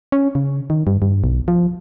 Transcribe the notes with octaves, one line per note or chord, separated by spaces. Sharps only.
C#4
C#3
D#3
G2
G2
B1
F3